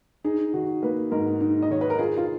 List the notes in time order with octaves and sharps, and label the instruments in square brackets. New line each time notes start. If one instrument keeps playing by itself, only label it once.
[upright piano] D#4 G#4
D#3 F#4
A#3 B4
G#2 A#4
D#4
D#5
D#3 C#5
B4
A#4
F4 G#4
F4